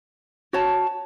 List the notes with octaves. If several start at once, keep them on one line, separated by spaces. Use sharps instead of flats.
F#4 C#5 A5